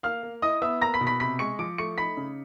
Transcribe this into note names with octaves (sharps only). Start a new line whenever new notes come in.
A#3 F5 F6
A#3
E4 D#5 D#6
B3 E5 E6
A#3 A#5 A#6
B5 B6
B2
B5 B6
C3 B5 B6
G#3 C#6 C#7
F3 D6 D7
A3 C#6 C#7
D#4 B5 B6
C#3